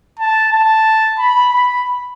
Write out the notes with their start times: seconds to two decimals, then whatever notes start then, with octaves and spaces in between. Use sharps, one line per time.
0.19 A5
0.53 A5
1.18 B5
1.53 B5